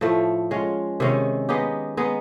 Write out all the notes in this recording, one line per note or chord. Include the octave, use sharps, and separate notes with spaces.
A2 F3 A3
G#3 C#4 F4
C3 D#3 G#3 C#4
G#3 B3 D#4 G4
G#3 B3 D#4